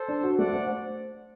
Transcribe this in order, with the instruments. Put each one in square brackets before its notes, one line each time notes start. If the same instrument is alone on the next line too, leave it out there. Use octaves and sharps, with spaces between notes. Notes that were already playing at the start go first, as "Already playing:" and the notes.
Already playing: [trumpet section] A4 C5
[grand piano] D4
F#4
[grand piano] A3 [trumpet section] D5 F#5
[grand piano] C5